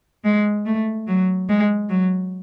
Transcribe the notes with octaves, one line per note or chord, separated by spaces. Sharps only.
G#3
A3
F#3
G#3
F#3